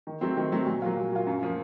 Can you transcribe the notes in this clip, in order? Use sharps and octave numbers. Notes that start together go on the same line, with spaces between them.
D#3
F#3 A3 C4
D#3
F#3 A3 C4
A#2
F#3 A#3 F4
A#2
F#3 A#3 F4
F#2
F3 A#3